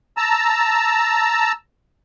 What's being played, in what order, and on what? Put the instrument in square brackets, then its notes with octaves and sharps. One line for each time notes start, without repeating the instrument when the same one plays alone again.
[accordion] A5 A#5 E6